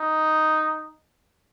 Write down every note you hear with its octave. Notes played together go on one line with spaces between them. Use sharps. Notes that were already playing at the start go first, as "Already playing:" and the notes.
Already playing: D#4